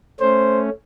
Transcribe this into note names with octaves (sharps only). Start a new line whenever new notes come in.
A3 C#4 C5